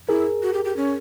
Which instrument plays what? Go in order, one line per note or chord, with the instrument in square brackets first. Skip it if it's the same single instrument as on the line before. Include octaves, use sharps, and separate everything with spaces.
[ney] E4 [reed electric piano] G#4 A#4
[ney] F#4
G4
G4
C#4